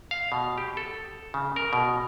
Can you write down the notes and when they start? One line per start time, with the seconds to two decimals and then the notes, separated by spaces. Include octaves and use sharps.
0.11 F5
0.32 B2
0.58 G4
0.77 A4
1.34 C#3
1.56 A#4
1.73 B2